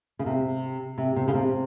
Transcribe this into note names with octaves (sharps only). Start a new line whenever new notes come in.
C#3
C3
C3
C3
C#3
C3